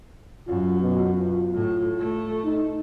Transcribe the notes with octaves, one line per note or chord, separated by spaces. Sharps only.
F#2 F4
B2
F4
A2
A3
D#4